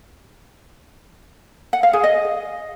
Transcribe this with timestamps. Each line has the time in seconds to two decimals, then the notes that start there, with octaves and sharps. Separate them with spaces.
1.73 F#5
1.83 F5
1.93 G#4
2.04 D#5